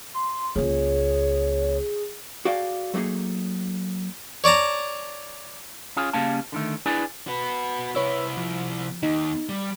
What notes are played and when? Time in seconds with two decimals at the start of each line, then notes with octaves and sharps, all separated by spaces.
0.14 C6
0.56 C#2 A#3 G#4 C#5
2.45 F#4 G#4 A4 D5 F5 G5
2.94 F#3 A3 A#3 D#4 G#4
4.44 C#5 D5 A5 A#5
5.96 C#4 F4 G#4
6.13 C#3 G3 A#3 C#4 F5 A5
6.52 D3 D#3 A3
6.86 D4 E4 G#4 B4 D5 G#5
7.27 F#4 B4
7.95 C3 E4 B4 C#5 E6
8.37 F3
9.03 D#2 D#4
9.49 G3